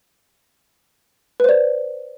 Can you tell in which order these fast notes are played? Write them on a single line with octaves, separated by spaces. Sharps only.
B4 C5 D5